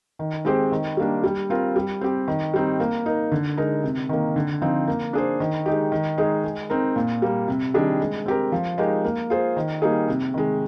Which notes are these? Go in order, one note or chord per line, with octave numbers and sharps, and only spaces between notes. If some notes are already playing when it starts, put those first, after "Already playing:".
D#3
G#3 C4 G4 C5
D#3
G3 A#3 D4
G3
C4 F4 A#4
G3
C4 G4
D#3
G3 C4 D#4
A#3
D#4 A#4
D3
G#3 D#4 A#4
C3
D#3 A#3
D3
F3 C4 D#4
A#3
D4 G#4 C5
D#3
G#3 D#4 G4
D#3
G#3 D#4 G#4
G#3
C4 D#4 A#4
A#2
G3 A#3
C3
D#3 G3 D4 G#4
G#3
C4 G4 A#4
F3
G#3 D#4 G4 A#4
A#3
F4 G#4 C5
D#3
G3 A#3 D#4 G#4
C3
D#3 G#3